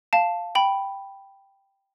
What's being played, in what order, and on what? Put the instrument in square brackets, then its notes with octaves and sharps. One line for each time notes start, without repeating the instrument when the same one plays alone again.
[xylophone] F5 A5
G5 B5